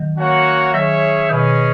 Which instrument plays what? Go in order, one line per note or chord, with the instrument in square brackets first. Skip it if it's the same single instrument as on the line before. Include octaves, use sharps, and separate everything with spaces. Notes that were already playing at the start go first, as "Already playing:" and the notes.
Already playing: [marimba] D#3 F#3
[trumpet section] A#3 C#4 F#4 C#5 F#5
[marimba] D#3 F#3 [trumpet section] C#4 G#4 C#5 E5
[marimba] B2 D#3 [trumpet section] C#4 G#4 B4 D#5